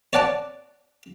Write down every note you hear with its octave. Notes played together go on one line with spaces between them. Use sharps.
C#5 D5 F#5 A5 D6